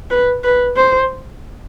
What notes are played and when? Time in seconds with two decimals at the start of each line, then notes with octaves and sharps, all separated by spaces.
0.10 B4
0.44 B4
0.76 C5